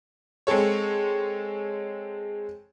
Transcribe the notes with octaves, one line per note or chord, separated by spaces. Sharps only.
G#3 C4 G#4 A4 C#5